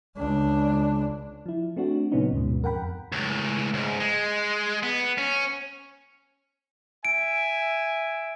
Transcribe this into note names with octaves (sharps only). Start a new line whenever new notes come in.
C#2 D4
F3 E4
A3 C4 D4 F#4
A#2 C#3 F#3 B3 C#4 D#4
D2 G#2 B2
F2 A#4 F#5 G5 B5
C#2 A2
C#2 G#2
G#3
B3
C#4
E5 G#5 D7